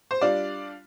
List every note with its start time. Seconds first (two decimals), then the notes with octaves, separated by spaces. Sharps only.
0.11 C5
0.21 G3 D4 F4 D5